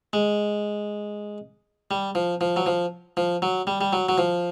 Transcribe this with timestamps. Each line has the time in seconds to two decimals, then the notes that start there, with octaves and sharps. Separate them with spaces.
0.13 G#3
1.91 G3
2.15 F3
2.41 F3
2.57 F#3
2.66 F3
3.17 F3
3.42 F#3
3.67 G3
3.81 G3
3.93 F#3
4.09 F#3
4.18 F3